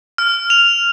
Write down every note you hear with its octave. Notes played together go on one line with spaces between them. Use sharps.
F6
F7